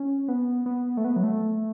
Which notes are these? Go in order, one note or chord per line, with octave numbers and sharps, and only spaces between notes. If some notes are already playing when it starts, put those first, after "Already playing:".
Already playing: C#4
B3
B3
A3
B3
F#3
A3